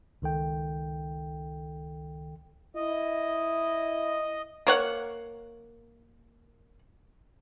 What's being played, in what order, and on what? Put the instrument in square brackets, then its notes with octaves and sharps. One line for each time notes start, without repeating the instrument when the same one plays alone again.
[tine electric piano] C#2 D#3 A4 G5
[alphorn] E4 [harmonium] D#5
[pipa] A#3 C#5 F#5